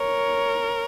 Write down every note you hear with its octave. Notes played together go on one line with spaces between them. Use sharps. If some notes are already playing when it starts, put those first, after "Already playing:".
Already playing: A#4 C#5